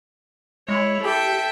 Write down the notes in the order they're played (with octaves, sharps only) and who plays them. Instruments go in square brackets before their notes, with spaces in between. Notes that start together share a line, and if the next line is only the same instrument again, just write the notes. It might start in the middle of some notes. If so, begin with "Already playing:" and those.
[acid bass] G#3 [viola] E4 C#5
[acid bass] G4 [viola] A4 [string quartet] E5 G5